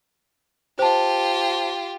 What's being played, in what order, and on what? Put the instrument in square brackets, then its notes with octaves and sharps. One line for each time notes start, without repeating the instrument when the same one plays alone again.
[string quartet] F4 G4 [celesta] C5 A5